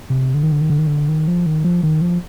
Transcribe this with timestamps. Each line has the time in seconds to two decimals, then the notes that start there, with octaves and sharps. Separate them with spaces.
0.10 C3
0.34 D3
0.43 D#3
0.52 D3
0.61 D#3
0.70 D3
0.78 D#3
0.87 D3
1.09 D#3
1.28 F3
1.46 D#3
1.64 F3
1.83 D#3
2.01 F3